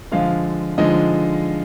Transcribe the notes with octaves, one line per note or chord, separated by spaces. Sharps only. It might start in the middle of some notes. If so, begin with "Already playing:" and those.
D3 F3 G#3 F4 F5
D3 F3 G#3 D#4 D#5